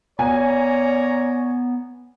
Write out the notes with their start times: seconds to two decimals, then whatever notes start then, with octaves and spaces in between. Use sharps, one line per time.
0.19 B3 C#5 D5 G#5 A#5